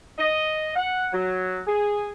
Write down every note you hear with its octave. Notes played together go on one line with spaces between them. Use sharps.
D#5
F#5
F#3
G#4